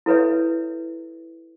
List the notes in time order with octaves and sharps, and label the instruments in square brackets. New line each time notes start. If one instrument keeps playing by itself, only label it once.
[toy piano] E4 A4 B4 C#5 E5